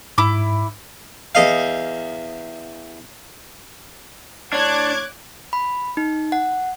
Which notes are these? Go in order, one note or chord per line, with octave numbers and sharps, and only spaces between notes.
G#2 E4 D6
E2 D#5 F5
A2 D4 C#5 D6 F#6 G#6
B5
D#4
F#5